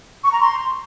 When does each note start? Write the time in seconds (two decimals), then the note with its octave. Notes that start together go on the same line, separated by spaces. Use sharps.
0.24 C#6
0.32 A#5
0.40 C6